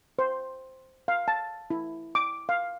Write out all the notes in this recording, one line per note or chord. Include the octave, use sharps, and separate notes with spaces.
C5
F5
A5
E4
D6
F5